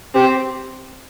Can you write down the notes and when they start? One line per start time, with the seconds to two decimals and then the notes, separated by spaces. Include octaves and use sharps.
0.15 C4 G4